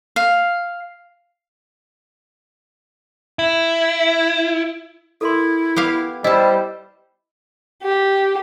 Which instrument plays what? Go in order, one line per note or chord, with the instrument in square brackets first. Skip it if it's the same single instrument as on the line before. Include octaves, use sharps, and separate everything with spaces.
[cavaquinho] F5
[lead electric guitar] E4
[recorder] E4 [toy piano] A4 A#4 C6
[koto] B3 G4 F5
[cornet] G3 [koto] E4 A5 [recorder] C5 [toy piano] D#5
[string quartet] G4